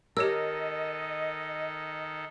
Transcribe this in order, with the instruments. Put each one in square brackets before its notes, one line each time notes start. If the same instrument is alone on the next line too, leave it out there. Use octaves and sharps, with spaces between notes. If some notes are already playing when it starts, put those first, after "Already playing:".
[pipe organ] D#3 A4 [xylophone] G4 C#5 E6 [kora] A#4 [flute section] D#5